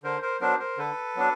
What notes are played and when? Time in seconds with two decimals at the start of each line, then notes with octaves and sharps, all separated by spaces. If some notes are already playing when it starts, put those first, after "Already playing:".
0.03 D3 A#4 C5
0.22 A#4 C5
0.41 F#3 B3 D4 A#4 C5
0.59 A#4 C5
0.77 D3 A4 B4
1.15 F#3 B3 D4